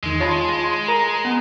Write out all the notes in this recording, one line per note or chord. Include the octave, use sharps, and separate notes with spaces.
E2 D#3 G#3
F4 C#5 A5 B5
A#4 A#5
B3